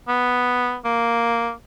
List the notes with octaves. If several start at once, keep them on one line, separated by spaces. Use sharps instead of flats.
B3
A#3